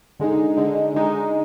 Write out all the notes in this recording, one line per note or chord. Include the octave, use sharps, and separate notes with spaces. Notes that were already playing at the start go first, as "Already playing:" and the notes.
D3 G#3 D#4
D3 G#3 D#4
D3 G#3 D#4